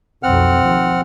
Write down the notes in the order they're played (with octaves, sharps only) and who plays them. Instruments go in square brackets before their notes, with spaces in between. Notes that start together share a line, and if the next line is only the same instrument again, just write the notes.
[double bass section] B1 F2 F#3 [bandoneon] C4 F#5 F6
[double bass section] D#2 F3